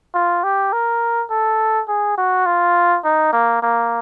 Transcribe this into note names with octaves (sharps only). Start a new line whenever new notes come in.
F4
G4
A#4
A4
G#4
F#4
F4
D#4
A#3
A#3